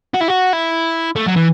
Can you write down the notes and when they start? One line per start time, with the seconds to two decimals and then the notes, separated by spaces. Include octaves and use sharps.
0.14 F#4
0.21 E4
0.28 F#4
0.53 E4
1.16 A3
1.27 F#3
1.36 E3